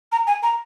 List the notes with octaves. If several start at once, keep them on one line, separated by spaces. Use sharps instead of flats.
A#5
G#5
A#5